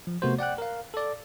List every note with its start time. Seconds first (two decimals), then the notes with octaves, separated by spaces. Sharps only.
0.07 F3
0.22 C3 A3 B3 F#4 A#4 C5
0.39 D5 F#5 G5 F#6
0.58 A#4 F5
0.94 A4 D5